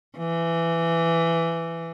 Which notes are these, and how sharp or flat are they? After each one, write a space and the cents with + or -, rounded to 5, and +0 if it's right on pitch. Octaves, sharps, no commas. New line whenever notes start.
E3 +15